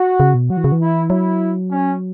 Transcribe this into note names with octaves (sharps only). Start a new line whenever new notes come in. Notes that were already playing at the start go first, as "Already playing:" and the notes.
Already playing: F#4
C#3
B2
F#3 F#4
E3
C#3
E3
E4
F#3 E4
C#4